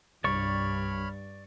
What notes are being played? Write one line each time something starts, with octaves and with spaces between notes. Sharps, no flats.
C2 G2 G3 C#5 D5 B5 C#6 F6